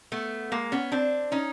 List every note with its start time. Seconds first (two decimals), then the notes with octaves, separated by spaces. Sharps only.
0.12 A3 B3
0.52 G#3 A#3
0.72 B3 C#4
0.92 C4 D4
1.32 C#4 D#4